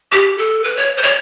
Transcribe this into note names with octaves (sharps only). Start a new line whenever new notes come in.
G4
A4
B4
C#5
C5
C#5